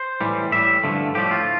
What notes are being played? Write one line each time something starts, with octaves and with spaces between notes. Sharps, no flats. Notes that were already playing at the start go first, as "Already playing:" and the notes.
Already playing: C5
A2 E3 G3
A2 G3 E5
G2 D3 F3 A3
A2 F3 A3 G4
F4